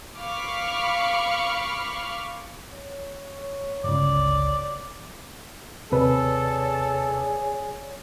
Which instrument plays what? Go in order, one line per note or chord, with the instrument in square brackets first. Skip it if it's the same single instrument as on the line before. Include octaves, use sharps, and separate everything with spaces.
[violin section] F5 B5 C#6 D6 F6
[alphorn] C#5
[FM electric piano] G1 C#2 [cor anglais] D5
[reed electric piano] D#2 C3 B4 [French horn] G#4 [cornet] A4 [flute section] C#5 D5